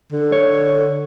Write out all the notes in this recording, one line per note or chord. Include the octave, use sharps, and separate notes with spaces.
D3
C#5